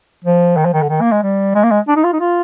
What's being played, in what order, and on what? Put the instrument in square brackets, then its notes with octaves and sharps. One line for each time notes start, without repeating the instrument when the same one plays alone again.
[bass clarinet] F3
D#3
F3
D#3
D3
D#3
A#3
G#3
G3
G#3
A#3
G#3
D4
D#4
F4
D#4
F4